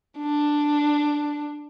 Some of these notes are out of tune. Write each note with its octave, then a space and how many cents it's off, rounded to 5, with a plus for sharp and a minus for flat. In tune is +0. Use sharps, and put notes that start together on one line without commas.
D4 +5